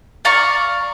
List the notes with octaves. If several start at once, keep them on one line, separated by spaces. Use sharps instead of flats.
D5 F5 A#5 C#6